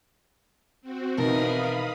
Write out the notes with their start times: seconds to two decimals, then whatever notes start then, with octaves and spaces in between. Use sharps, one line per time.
0.81 C4 F#4
1.17 B2 D#3 E3 D#4 A#4 F5 B5 D#6